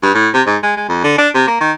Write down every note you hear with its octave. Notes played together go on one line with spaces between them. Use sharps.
G2
A2
C3
G#2
G#3
G#3
F2
D3
D4
C3
A#3
D#3